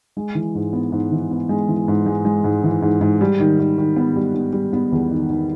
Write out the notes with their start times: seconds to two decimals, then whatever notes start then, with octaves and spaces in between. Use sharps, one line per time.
0.17 G#3
0.35 E3
0.55 G#2
0.73 B3
0.92 G#2
1.12 E3
1.31 B3
1.49 G#3
1.68 E3
1.88 G#2
2.06 G#3
2.25 G#3
2.44 G#2
2.64 E3
2.82 G#2
3.01 G#2
3.21 G3
3.40 D#3
3.59 D#3
3.78 D#3
3.96 B3
4.16 G3
4.34 B3
4.53 G3
4.73 B3
4.92 E2
5.11 D#3
5.30 D#3